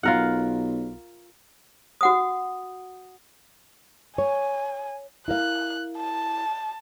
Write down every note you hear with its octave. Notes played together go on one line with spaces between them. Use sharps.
B1 F4 A#4 F#5
F#4 F#5 D#6
C#5 G#5
E4 A#4 F5 F#6
A5